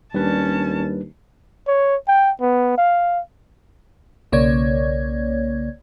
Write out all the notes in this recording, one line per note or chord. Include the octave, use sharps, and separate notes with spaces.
D#2 G3 C#4 D4 B4 A5
C#5
G5
B3
F5
B1 C#3 A#3 C#5 D5 G#6